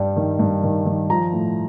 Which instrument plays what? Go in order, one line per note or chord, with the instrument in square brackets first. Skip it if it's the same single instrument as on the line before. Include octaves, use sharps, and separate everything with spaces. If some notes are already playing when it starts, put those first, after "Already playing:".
Already playing: [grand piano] G2 G3
D#3
G2
D#3
D#3
F3 A#5
A2